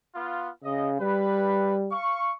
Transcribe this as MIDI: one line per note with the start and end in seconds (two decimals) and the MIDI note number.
0.15 0.50 59
0.15 0.50 65
0.64 0.98 49
0.64 0.89 75
1.01 1.93 55
1.01 1.75 71
1.92 2.33 77
1.92 2.33 85